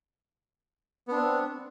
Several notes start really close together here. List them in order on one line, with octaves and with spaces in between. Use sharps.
B3 D4 C4